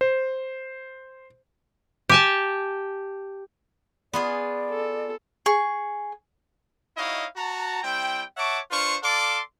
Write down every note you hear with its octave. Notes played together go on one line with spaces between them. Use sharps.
C5
G4 G#5 A5
B3 F4 G#4 D5
A4
G#4 C#6
D#4 E4 F#4 C#5 D#5 F5
F#4 A5 A#5
G3 C4 E4 G5
C#5 E5 F#5 A5 C#6 D6
D4 F4 B4 C5 F5 C#6
A4 D5 F5 A5 C6 D6